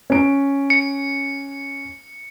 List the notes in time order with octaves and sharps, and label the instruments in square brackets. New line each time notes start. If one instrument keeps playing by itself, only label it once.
[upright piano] C#4 D7
[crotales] C#7